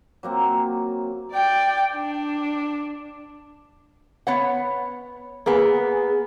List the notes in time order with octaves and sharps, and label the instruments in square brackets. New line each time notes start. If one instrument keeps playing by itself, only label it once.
[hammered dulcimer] F#3 A#3 C4
[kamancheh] D5 G5
D4
[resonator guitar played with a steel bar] B3 C#5 F#5
[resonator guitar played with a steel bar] A#3 B3 [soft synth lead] G#4